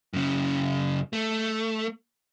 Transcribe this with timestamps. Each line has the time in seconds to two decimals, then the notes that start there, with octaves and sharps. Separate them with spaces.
0.13 F#2 C#3
1.13 A3